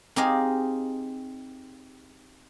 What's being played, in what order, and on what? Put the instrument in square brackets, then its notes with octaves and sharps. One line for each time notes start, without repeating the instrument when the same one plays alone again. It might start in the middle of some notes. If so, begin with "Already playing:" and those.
[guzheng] C4 D#4 G4 G#4 D#5 F5